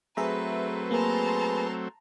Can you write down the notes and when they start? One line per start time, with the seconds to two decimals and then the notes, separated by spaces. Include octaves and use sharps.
0.17 F#3 A3 C4 G#4 B4 E5 A#5
0.91 A#3 G#4 B4 A5 A#5 C6